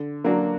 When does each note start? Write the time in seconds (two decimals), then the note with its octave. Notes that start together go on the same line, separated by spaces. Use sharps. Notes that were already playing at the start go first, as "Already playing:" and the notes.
Already playing: D3
0.24 F#3 A#3 D4 F#4